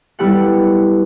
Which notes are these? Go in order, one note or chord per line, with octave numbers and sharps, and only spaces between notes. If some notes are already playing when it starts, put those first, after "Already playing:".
G3 B3 E4 G4 A4 F#5